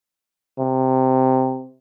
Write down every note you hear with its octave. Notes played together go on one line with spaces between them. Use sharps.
C3